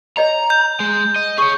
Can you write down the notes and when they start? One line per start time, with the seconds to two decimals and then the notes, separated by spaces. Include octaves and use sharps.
0.17 C#5 D#5 G5 A#5
0.50 G6
0.80 G#3
1.16 D#5
1.38 G#4 C#5 C#6